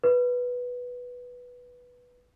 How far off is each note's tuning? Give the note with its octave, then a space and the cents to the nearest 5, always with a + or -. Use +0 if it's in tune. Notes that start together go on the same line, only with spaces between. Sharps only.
B4 -5